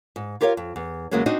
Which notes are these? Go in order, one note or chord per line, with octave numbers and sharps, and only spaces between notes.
G#2
F4 G4 A#4 C#5 D5 F5
F2
E2
E2 C#3 F#3 G#3 A#3 C#4
C4 D4 D#4 F#4 D#5